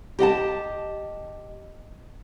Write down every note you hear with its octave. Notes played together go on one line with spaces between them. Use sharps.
G4 D#5 F#5 A5